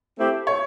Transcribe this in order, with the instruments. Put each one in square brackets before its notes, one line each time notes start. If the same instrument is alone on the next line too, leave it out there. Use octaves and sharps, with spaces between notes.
[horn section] A3 C4 E4 G4
[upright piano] C#5